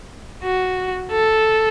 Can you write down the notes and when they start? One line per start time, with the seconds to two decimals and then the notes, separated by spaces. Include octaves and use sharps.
0.44 F#4
1.11 A4